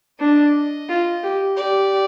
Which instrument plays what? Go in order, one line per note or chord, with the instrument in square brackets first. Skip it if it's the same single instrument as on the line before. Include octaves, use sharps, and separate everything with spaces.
[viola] D4 [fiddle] D#5
[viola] F4
G4
[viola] G4 [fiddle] D5